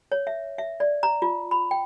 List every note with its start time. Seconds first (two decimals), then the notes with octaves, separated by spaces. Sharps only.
0.12 C#5
0.27 E5
0.58 E5
0.80 D5
1.03 A#5
1.22 F4
1.51 B5
1.71 G5